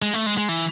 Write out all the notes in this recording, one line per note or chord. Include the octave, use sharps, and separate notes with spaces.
G#3
A3
G#3
G#3
E3